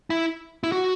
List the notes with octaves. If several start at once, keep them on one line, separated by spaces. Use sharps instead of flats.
E4
E4
F#4